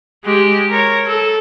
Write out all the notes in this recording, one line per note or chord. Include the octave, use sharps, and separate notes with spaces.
G#3 G4
A#4 C#5
A4